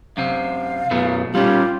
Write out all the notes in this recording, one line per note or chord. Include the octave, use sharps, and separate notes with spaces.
F#2 C3 C4 F5
F#2 B2 A3 B3
G3 C#4 F4 G4